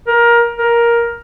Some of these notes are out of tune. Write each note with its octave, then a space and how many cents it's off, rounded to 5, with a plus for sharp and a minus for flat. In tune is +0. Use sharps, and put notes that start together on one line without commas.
A#4 +20
A#4 +10